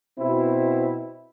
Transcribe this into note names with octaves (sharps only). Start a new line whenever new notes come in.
B2 C4 E4